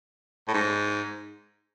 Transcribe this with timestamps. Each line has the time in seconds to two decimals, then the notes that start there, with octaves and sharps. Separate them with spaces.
0.48 A2
0.54 G#2